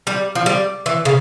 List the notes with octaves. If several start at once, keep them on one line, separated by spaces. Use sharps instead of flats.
G3
F3
G3
E3
C#3